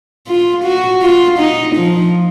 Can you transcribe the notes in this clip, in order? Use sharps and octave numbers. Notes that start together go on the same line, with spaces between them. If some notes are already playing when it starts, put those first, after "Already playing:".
F4
F#4
F4
D#4
F3